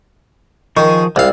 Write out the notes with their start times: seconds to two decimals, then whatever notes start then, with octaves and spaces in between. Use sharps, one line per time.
0.77 D#3 F3 G#4 C#6
1.16 C2 G#3 D5 F5 E6